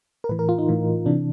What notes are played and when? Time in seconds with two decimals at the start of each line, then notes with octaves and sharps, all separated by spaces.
0.24 A#4
0.29 A2 E3 B4
0.39 A#4
0.49 F4
0.59 D#4
0.69 A2 E3
1.06 C3 E3 D4